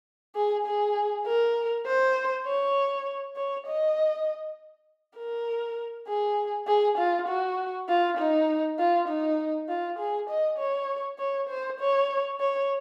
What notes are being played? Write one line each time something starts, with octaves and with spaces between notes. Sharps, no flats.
G#4
G#4
A#4
C5
C#5
C#5
D#5
A#4
G#4
G#4
F4
F#4
F4
D#4
F4
D#4
F4
G#4
D#5
C#5
C#5
C5
C#5
C#5